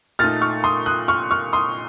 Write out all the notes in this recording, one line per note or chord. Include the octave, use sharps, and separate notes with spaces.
A#2 A3 D#4 F6 A6
C#6 F6
C6 D#6
D#6 F#6
C#6 F6
C#6 F6
C6 D#6